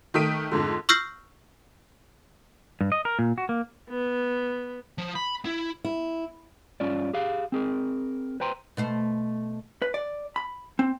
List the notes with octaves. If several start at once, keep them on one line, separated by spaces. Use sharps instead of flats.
D#3 A3 D#6 B6 D7 D#7
F2 G#2 D3
C#6 E6 F6 G6 A#6 C7
G2
D#5
A#4
A#2
F#4
A#3
B3
F3
B5
E4
E4
G2 C#4 F4 D5
G4 G#4 F5
C4 G#4 A#4
B4 C5 G5 A#5 C6
B2 A3 C5
B4
D5
B5
C4